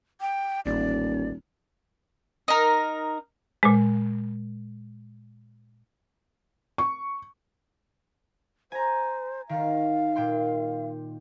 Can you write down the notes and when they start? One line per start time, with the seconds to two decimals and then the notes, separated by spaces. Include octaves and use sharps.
0.21 G5
0.66 D#1 A1 D5
2.48 D#4 A#4
3.63 A#2 G#3
6.78 C#6
8.72 C5 G#5 A#5
9.49 D#3 F5
10.16 A#2 G5 C6